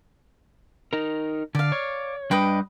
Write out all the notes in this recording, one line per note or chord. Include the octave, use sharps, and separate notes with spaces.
D#4 A#4
D3 D5 F5
C#5
G3 D4 B4 D#5 G5